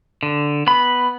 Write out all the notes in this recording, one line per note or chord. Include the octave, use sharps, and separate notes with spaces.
D3
B3 B5